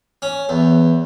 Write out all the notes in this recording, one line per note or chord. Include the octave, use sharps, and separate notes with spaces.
C#4
E2